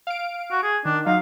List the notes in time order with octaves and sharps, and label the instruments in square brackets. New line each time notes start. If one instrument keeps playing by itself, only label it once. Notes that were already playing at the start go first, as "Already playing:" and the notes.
[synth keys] F5 D7
[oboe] F#4
G#4
[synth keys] D#3 [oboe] D4
[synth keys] F#3 D#4 [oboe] F5